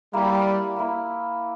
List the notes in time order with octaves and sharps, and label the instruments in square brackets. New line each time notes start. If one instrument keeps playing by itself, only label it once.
[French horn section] G3 [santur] A#3 E4 A#4
[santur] A#3 E4 A#4